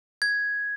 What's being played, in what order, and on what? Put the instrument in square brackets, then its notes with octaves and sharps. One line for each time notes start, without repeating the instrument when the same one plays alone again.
[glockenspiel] G#6